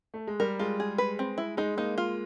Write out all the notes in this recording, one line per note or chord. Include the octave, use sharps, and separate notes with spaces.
A3
G#3
G3 A#4
G#3 F4
G#4
B4
C4
E4
G#3 D#4
A#3 D#4
F4